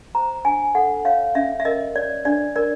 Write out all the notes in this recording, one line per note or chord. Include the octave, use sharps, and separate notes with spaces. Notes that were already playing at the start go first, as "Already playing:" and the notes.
C5 A#5
D4 G#5
A4 F#5
C#5 F5
C#4 E5
E5
A#4 D#5
C#5 D5
D4 D5
A#4 D5